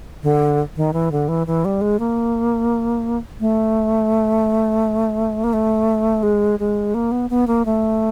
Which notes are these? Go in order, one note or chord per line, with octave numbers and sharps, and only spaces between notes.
D3
D#3
E3
D3
E3
E3
G3
G#3
A#3
A3
A#3
A3
G#3
G#3
A#3
B3
B3
A#3
A3